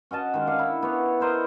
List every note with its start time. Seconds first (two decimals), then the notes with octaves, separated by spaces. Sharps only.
0.11 C#4 F#4 D#5 A5
0.34 D#3 G#3
0.47 D4 F5 F#5
0.59 E4
0.82 B3 C#5
1.20 E4 A#4 C5 D#5